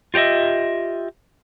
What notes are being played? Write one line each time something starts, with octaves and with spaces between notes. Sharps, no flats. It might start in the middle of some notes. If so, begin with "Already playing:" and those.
F4 G4 C#5 D#5 E5